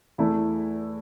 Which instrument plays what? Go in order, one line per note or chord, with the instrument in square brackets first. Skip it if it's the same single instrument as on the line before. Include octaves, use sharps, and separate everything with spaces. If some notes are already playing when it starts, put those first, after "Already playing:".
[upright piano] E2 E3 A3 E4